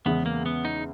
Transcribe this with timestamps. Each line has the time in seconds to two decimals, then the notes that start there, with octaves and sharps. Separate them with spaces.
0.05 E2 C#3 E3 G#3 B3
0.26 A#3
0.46 B3
0.65 D#4